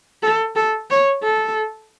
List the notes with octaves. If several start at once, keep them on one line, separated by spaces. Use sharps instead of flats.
A4
A4
C#5
A4